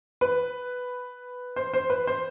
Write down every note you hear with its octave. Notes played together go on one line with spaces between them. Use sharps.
B4
C5
C5
B4
C5